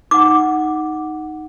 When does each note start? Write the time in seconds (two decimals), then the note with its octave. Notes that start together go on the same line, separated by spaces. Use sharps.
0.11 D#4 F#5 D6